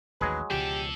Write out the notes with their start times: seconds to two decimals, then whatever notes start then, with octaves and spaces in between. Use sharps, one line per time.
0.21 A1 D#2 D#3 F#3 G#3 G#4 B4
0.51 C#2 B2 F3 D4 G4 A4